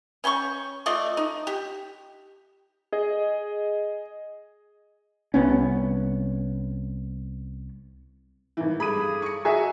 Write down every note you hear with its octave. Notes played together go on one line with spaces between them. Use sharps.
C#4 G5 B5 C#6
A3 F4 D5 D#5
D#4
G4
G#4 D#5
C2 B3 C#4
G#1 E3
G2 G#4 A4 B5 D#7
C#6 C#7
F#4 G#4 D#5 E5 G#5 A#5